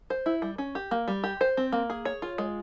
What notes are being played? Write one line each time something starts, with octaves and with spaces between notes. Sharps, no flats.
C5
E4
G3
C#4
G4
A#3
G3
G4
C5
C4
A#3
G#4
C#5
F4
G#3